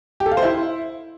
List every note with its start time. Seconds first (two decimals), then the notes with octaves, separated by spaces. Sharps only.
0.20 G4
0.26 A4
0.31 F5
0.37 C5
0.43 E4